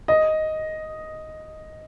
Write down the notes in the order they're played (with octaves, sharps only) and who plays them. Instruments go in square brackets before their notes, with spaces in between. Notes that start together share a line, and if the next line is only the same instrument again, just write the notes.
[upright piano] D#5